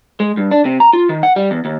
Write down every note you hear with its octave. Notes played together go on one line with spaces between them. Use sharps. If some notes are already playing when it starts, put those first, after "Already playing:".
G#3
G2
D4
C3
A#5
F4
D#3
F#5
G3
E2
D#2